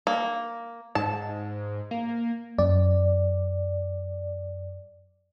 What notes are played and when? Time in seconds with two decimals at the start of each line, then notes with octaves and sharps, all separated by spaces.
0.07 A#3
0.95 G#2 A5
1.91 A#3
2.58 F#2 D5